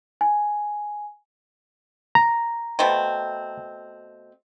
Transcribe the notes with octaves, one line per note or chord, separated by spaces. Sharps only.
G#5
A#5
B2 A3 C4